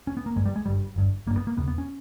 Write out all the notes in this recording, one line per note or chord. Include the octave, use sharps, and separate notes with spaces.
C#4
B3
A#3
G1 G2 G#3
G3
G#3
G1 G2 G3
G1 G2
G1 G2 A#3
B3
A#3
E1 E2 C#3 B3
B3
C#4